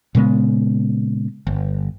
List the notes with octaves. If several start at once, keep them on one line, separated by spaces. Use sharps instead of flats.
A#2 C#3 G#3 B3
G1